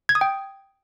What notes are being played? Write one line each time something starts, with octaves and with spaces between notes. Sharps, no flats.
G#6
D#6
G5